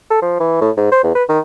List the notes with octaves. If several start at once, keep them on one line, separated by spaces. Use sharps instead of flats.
A4
F3
E3
A2
G#2
C5
E2
B4
D#3